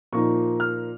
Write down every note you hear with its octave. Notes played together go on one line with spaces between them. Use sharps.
A#2 F3 A#3 D#4 C#6
F6